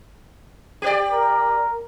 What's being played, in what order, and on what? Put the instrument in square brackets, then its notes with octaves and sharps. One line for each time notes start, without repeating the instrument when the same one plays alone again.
[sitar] G4 B4 D5
[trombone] A#4